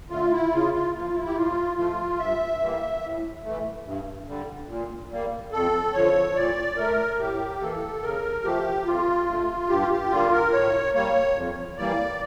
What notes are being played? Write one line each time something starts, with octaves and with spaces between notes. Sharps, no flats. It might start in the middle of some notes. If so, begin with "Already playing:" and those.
D3 A3 F4
E4
C#3 F4
F4
F3 A#3 F4
E4
G4
A2 F4
F3 A3 F4
G2 E5
E3 G3 A#3
A2
E3 A3
G2
D3 G3
A#2
G3 A#3
F2 A4
D3 F3 C#5
A#2 D5
A3 A#4
A2 G4
E3 A#3 A4
C#3 A#4
F3 A3 G4
F2 F4
D3 A3
G2 G4
F4
G4
D3 G3 A#3 F4
A#4
A2 C#5
G3 A#3 C#5
F2
E3 G3 A#3 D5